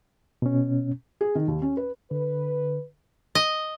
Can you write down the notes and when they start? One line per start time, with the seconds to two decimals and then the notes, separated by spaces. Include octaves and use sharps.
0.42 B2 C#4
1.21 G#4
1.35 D#3
1.48 D#2
1.62 C#4
1.77 B4
2.11 D3 B4
3.35 D#5